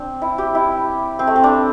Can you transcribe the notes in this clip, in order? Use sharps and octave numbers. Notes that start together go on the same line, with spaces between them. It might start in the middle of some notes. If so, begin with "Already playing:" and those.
Already playing: C4 D4
E4
G4
E4
C4
A3
C4
D4